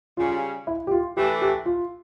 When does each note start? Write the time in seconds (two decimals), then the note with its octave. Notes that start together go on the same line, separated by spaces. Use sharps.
0.17 C#3 G3 C#4 F4
0.67 E4
0.87 G4
0.91 F4
1.17 E3 A3 D4 G4
1.42 G4
1.66 F4